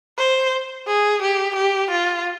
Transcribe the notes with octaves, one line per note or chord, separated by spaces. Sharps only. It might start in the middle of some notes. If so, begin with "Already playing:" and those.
C5
G#4
G4
G4
F4